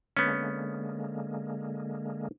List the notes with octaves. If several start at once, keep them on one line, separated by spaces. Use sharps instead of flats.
D3 G#3 A#3 B3 C#4